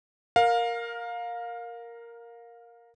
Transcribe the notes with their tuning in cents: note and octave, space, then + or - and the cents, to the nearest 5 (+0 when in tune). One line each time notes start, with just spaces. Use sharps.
A#4 +0 F5 +20